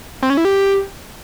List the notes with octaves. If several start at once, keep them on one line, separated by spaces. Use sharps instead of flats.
C4
C#4
E4
G4